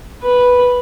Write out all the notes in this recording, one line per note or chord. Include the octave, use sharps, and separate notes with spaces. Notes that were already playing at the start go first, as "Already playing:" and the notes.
B4